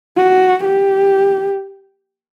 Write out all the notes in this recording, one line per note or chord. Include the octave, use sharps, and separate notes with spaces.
F#4
G4